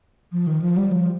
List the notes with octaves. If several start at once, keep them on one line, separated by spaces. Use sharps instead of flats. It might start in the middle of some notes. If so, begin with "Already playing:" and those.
F3
D#3
F3
G3
F3